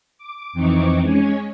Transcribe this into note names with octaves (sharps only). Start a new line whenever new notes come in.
D6
F2 E3 C4 D#4 C#6 D6
G#3 C#4 C#5 G#5